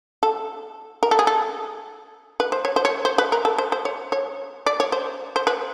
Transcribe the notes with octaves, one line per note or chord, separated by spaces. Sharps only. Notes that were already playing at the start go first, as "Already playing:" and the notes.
A4
A#4
A4
G#4
A4
B4
C5
C#5
C5
C#5
C5
B4
A#4
A4
C5
C5
C#5
C#5
D5
C#5
C5
C5
B4